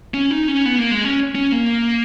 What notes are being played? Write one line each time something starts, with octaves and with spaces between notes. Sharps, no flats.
C#4
D#4
C#4
B3
A#3
G#3
C#4
C#4
A#3